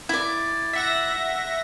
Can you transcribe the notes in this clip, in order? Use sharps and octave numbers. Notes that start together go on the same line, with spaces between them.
E4 D5
E5 F#5 A#6